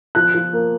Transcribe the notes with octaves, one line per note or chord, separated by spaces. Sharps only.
F3 F#6
F3
A#3